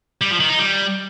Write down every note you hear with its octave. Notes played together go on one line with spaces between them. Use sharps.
G3
F3
D#3
D#4
G3